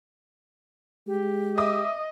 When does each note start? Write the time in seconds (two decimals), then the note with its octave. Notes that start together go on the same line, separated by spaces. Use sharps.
1.07 G#3 G4
1.58 D#5 E5 D6 D#6